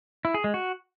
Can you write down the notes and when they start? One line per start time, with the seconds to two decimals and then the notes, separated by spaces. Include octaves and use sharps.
0.25 E4
0.34 G#4
0.44 G#3
0.54 F#4